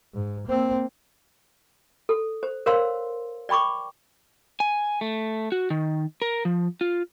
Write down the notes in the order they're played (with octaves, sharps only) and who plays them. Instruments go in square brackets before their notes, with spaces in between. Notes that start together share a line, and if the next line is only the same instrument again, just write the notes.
[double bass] G#2
A#3 C4
[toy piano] A4
C5
A#4 C5 C#5 F5 C6 E6
D5 G5 B5 C#6 D6
[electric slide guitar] G#5
A3
F#4
D#3
A#4
F3
F4